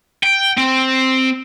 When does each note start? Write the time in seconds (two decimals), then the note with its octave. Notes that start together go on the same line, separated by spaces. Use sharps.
0.24 G5
0.58 C4